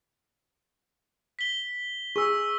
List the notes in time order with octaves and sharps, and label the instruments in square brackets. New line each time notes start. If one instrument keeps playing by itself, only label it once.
[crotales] B6 G7
[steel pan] G#4 [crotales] C#6 E6